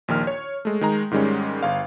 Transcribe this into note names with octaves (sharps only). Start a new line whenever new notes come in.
A#1 D#2 D#3 F6
C#5
G#3 A3
D#3 G#3 A#5
G#2 D#3 G3 G#3 C#4
G1 F5